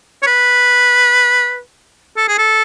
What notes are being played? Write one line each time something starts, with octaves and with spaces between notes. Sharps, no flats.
C#5
B4
A4
G#4
A4